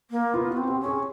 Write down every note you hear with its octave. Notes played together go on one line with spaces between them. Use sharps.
A#3
B3 F4
F#4
C4
G4
C#4
G#4